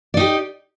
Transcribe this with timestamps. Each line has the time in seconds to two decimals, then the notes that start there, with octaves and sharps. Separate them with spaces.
0.14 D5
0.17 D#4
0.20 G4